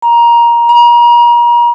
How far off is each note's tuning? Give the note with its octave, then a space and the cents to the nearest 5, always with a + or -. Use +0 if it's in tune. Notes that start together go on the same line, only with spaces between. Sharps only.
A#5 +15
A#5 +35